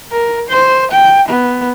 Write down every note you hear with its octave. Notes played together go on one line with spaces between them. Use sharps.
A#4
C5
G5
B3